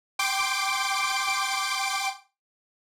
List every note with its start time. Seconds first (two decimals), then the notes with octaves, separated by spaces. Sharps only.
0.19 G5 C6 D6 D7